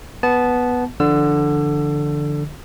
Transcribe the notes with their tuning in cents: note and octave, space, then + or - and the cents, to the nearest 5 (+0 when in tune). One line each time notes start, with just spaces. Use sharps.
B3 +0 A5 -20
D3 +0 F3 -40 E6 +25